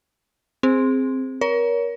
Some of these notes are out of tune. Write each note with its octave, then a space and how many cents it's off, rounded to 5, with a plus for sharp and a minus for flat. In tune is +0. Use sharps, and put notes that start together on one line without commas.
C4 +0 G#4 -5
A#4 +25 C#5 +30